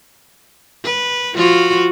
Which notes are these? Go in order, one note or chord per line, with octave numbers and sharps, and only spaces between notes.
B4
F3 F4 F#4